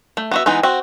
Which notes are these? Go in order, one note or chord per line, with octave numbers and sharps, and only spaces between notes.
A3
B3 F#4 E5
E3 G#3 B3 D#4
C4 F#4